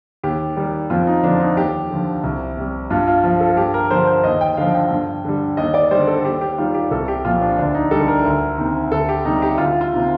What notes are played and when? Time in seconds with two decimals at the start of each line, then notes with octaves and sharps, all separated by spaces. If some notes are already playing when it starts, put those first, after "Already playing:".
0.23 D#2 G4
0.57 D#3 G3
0.90 F2 F4
1.07 D#4
1.23 D3 F3 D4
1.40 D#4
1.57 D#2 G4
1.91 D3 F3
2.23 C2
2.57 C3 G3
2.90 G2 F4
3.08 F4
3.24 F3 F4
3.40 A4
3.57 G2 G4
3.74 A#4
3.91 D3 F3 C5
4.07 C5
4.24 D#2 D#5
4.41 G5
4.57 D3 F3 F5
4.74 G5
4.91 G2
5.25 D3 G3
5.57 D#2 D#5
5.74 D5
5.91 D3 G3 C5
6.07 A4
6.24 D#2 G4
6.41 G4
6.58 D#3 G3 F4
6.74 G4
6.91 C2 A4
7.08 G4
7.24 A#2 F3 F4
7.42 D4
7.58 D2 D4
7.75 D#4
7.91 D3 G3 A4
8.08 A#4
8.24 D2
8.58 C3 D#3
8.91 D2 A4
9.09 G4
9.25 C3 G3 D#4
9.42 G4
9.58 D2 F4
9.81 F4
9.92 C3 D#3